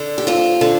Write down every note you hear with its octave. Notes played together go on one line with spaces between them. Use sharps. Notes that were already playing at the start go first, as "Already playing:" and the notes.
Already playing: D3
G4
D2 C4 F4
D3